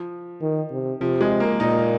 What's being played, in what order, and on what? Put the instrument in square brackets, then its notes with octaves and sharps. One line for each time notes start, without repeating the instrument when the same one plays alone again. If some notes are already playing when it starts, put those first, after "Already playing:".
Already playing: [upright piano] F3
[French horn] D#3
C3
[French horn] C3 [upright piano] F3
[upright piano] G#3
A#3
[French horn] A#2 [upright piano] D#4